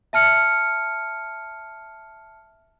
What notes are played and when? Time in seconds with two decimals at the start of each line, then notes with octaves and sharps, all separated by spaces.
0.13 E5 A5 F6 C#7